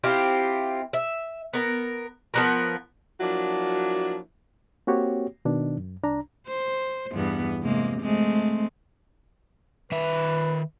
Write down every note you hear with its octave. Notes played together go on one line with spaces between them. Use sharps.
C4 E4 F4 G4
E5
B3 A#4
F3 B3 A#4
F3 F#3 A#3 D4 E4 F#4
A#3 C4 F#4 G4 C#5
B2 D#3 D4
F#2
C2 D4 A#5
C5
E2 G2 B3
C3 G#3 A#3
G#3 A3 C4
D#3 B4 E5